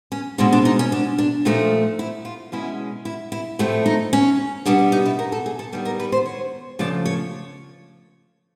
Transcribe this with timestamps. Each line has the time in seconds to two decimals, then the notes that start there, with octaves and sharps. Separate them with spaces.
0.12 C#4
0.38 B2 G#3 C4 D4
0.53 D4
0.65 D#4
0.79 C#4
0.92 D4
1.18 D4
1.45 A#2 F3 A3 D#4
1.99 E4
2.25 F4
2.52 B2 G#3 C#4 E4
3.05 E4
3.32 E4
3.59 A2 F3 A3 C4
3.86 D#4
4.13 C#4
4.66 B2 G3 B3 D4
4.92 D#4
5.06 E4
5.19 A#4
5.32 A4
5.46 G#4
5.59 A4
5.72 D#3 G3 B3
5.85 A#4
6.00 B4
6.12 C5
6.26 C#5
6.79 C#3 F3 A3 D5
7.06 C#5